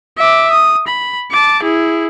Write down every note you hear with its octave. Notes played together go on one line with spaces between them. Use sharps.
E5 D6
D#6
B5
A5 D6
E4 G#4